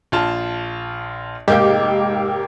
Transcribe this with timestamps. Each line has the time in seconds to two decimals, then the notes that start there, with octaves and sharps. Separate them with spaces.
0.12 A#1 F4 A5
1.48 F1 G#2 A#3 G4 D#5 F5 G5 D6